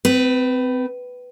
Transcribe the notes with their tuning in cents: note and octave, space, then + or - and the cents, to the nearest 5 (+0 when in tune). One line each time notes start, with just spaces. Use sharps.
C4 -30 B4 +5